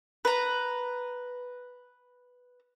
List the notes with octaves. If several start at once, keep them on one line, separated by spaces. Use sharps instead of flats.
B4 A#5